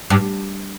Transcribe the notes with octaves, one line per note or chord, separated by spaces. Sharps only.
G2